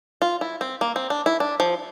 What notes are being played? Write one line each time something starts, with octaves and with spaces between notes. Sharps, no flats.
F4
E4
C4
A#3
C4
D4
E4
D4
F3